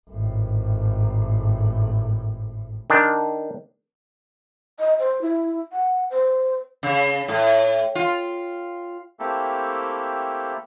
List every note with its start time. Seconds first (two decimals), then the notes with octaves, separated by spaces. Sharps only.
0.10 G#1 A2
2.90 D#3 D4
4.79 D#5
4.99 C5
5.21 E4
5.72 F#5
6.10 C5
6.83 C#3
7.28 A2
7.95 F4
9.20 A3 A#3 C4 E4 G4 A4